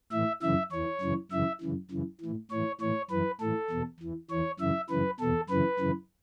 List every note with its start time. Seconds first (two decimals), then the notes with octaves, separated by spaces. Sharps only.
0.11 A2 E3 E5
0.42 F#2 C#3 E3 E5
0.71 E2 E3 C#5
1.01 F#2 C#3 E3
1.31 F#2 C#3 E3 E5
1.61 F#2 C#3 E3
1.91 F#2 C#3 E3
2.21 A2 E3
2.51 A2 E3 C#5
2.81 A2 E3 C#5
3.11 F#2 E3 B4
3.40 A2 E3 A4
3.70 E2 B2
4.00 E2 E3
4.30 E2 E3 C#5
4.60 F#2 C#3 E3 E5
4.90 F#2 C#3 E3 B4
5.20 E2 B2 A4
5.50 F#2 C#3 E3 B4
5.80 F#2 C#3 E3